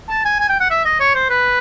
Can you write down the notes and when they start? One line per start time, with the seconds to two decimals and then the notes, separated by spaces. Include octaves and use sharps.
0.09 A5
0.25 G#5
0.40 G#5
0.49 G5
0.60 F#5
0.70 E5
0.85 D#5
1.00 C#5
1.15 C5
1.30 B4